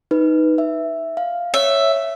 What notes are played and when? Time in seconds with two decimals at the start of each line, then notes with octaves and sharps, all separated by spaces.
0.11 D#4 B4
0.58 E5
1.17 F5
1.54 C#5 E5